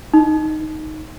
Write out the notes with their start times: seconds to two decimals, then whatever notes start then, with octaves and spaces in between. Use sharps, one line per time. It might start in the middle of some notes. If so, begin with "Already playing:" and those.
0.14 D#4